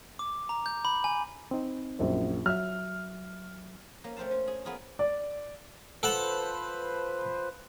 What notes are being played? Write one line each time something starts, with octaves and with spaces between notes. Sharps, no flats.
D6
A#5
G6
B5
G#5
C4 D#4
A#1 F#2 C5
F#3 E5 F6
A#3 C#4
A3 C4 C5 F5 A5
C#4
G#4
B3 F4 G#4 A#4
D5
F3 A4 B4 C5 F#5 A5